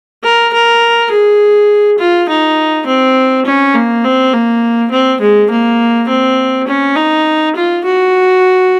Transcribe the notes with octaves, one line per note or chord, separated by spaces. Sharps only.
A#4
A#4
G#4
F4
D#4
C4
C#4
A#3
C4
A#3
C4
G#3
A#3
C4
C#4
D#4
F4
F#4